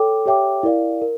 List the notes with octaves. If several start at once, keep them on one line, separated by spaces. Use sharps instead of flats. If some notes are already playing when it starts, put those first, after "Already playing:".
Already playing: A4 C#5 G5 D6
G4 C#5 E5 G5 D6
E4 A#4 D5 F5
A#4